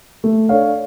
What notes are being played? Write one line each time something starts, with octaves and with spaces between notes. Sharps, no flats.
A3
D4 A4 C#5 F5